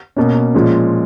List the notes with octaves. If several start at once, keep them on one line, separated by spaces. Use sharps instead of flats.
B2 A#3 C#4
A#2 F3 G#3 C#4